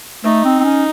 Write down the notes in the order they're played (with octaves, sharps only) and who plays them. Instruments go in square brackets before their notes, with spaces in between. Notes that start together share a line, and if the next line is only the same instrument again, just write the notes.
[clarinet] A3 [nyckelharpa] D#4
[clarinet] C4
C4
C#4